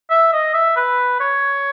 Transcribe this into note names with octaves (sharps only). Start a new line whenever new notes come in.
E5
D#5
E5
B4
C#5